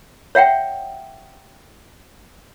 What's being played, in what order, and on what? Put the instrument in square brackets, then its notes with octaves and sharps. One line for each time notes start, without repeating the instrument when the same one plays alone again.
[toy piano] C#5 E5 F#5 G5